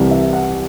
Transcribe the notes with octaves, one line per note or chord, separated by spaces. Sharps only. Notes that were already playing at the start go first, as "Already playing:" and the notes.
Already playing: C2 C3 E3
E5
F#5